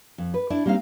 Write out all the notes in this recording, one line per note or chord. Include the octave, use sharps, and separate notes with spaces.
F2
B4
D4 E4 D5
G3 A#3 C4 D#4 F5